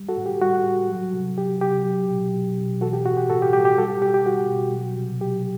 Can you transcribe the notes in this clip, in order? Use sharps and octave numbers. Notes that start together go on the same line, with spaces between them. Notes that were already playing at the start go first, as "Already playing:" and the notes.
Already playing: G3
F#4 A4
A2
G4
G3 F#4
A2
F#3
C3
F#3 G4
C3 G4
F#3
B2
F#3
B2
E3 F#4 A4
G4
A2 F#4
G4
A2 F#4 A4
G4
G3 G4
G4
G3 F#4 A4
G4
B2 G4
G4
G3 F#4
B2
F#3
C3
F#3 G4